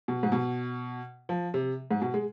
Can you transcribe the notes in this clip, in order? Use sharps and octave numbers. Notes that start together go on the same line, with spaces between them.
B2
G#2
B2
F3
C3
G#2
B2
G#3